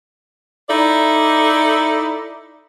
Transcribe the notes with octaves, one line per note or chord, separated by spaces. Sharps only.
D#4 E4 A4 D5